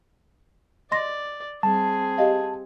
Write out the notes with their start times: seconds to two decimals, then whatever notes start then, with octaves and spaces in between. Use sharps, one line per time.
0.91 D5 D#5 C6 A#6
1.63 G3 C4 G#4 A5
2.18 G4 D#5 F5